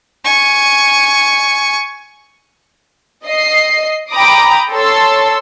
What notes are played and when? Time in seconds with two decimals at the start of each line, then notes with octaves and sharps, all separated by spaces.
0.25 G#5 C#6
3.26 D#5 C7
4.12 G5 A#5 B5 D6 D#6
4.72 A4 C#5 C6 E6